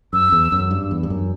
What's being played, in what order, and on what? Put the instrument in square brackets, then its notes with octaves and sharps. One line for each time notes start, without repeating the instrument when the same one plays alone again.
[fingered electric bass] F#2 [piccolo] E6
[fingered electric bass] E2
F#2
G2
E2
G2
F#2